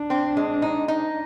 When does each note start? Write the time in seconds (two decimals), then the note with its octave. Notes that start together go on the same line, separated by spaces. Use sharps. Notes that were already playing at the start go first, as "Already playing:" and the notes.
Already playing: D4
0.10 C4
0.37 G#3
0.62 D#4
0.88 D#4